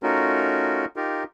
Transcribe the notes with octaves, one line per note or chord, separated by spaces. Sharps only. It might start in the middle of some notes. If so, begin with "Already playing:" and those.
A3 C#4 D#4 F4 F#4 A#4
D#4 F4 G4 A#4